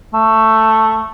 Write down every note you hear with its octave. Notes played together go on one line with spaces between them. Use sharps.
A3